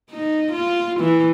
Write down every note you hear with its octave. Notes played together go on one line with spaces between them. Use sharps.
D#4
F4
E3